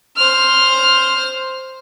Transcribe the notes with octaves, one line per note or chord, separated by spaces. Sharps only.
C5 F6